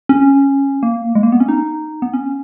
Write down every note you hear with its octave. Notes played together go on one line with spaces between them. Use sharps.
C#4
A#3
G#3
A#3
B3
C#4
D#4
B3
C#4